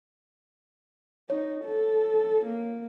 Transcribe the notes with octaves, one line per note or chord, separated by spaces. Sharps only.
D#4 C#5
A4
A#3